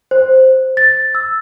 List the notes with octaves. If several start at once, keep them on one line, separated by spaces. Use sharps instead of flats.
C5
A6
E6